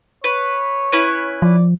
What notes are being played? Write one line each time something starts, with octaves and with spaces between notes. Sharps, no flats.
B4 C#5
C#4 E4 B4
F3 D5